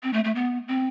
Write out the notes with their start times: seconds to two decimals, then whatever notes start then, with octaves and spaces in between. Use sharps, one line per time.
0.03 C4
0.13 A3
0.24 A3
0.35 B3
0.68 C4